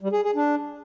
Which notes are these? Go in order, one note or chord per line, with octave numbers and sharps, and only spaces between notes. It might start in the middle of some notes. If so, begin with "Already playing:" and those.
G3
G#4
G#4
D4